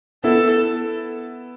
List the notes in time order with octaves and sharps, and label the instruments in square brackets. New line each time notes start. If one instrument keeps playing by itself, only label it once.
[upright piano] B3 E4 [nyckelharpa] A4